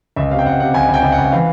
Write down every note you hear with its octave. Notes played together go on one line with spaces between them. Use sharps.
C#2 E5
C3 F5
G5
C#2 F#5
C3 F#5
C#2 G#5
C#2 G5
C#2
F#5
C#2
E3 F5